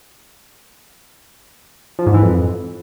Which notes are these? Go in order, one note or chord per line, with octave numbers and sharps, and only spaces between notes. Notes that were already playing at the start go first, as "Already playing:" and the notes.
F3
G#2
E3
F2